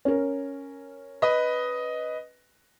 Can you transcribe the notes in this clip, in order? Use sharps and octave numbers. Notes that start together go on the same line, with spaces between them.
C#4 A#4
B4 D#5